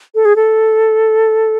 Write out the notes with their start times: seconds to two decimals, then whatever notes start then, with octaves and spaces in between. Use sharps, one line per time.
0.15 A4
0.25 G#4
0.36 A4